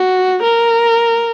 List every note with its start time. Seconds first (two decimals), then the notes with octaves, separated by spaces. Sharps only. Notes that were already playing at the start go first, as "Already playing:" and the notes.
Already playing: F#4
0.43 A#4